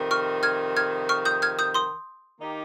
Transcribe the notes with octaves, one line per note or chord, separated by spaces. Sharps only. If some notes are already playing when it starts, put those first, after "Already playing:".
Already playing: F2 C3 D#3
C#6 F6
F6 G#6
F6 G#6
C#6 F6
D#6 G6
F6 G#6
D#6 G6
C6 D#6
D#3 A#3 D#4 G4